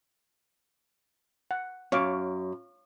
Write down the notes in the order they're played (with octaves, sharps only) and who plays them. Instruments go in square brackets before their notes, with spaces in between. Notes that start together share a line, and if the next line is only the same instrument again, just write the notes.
[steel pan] F#5
[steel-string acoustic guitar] F#2 [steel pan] C#5 F5 D6